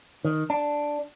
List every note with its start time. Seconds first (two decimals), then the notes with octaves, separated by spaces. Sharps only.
0.25 D#3
0.50 D4